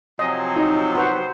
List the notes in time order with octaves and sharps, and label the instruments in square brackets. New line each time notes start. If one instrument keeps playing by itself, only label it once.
[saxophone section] C3 F3 F#3 [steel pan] D#5 [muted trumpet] G#5
[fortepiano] D#4
[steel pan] F#4 B4 F#5 [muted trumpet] C5